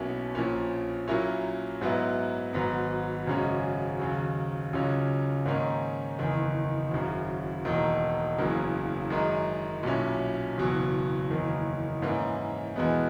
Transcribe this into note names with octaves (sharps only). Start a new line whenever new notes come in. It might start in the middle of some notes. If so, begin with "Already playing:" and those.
Already playing: B1 B2 A#3 C#4 E4
A#1 A#2 A#3 C#4
A#2 F#3 A#3 C#4 E4
G#2 F#3 B3 E4
G#1 G#2 F#3 B3
G#1 F#2 C#3 G#3 C#4
D#2 C#3 F#3
C#2 C#3 F#3 C#4
G#2 D#3 A#3 C#4
F#1 E2 D#3
G#1 F#2 C#3
E1 E2 D#3 A#3 D#4
F#1 E2 C#3 F#3 A#3
F#2 D#3 G#3
B1 A#2 F#3 C#4 E4
F#1 E2 B2 F#3
F#1 E2 D#3 A#3
G#2 E3 A#3 C#4
E2 B2 G#3 B3